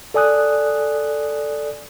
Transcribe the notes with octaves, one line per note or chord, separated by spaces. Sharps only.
A4 D5 G#5 D#6 F#6